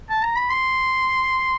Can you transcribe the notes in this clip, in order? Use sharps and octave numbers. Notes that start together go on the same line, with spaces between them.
A5
A#5
B5
C6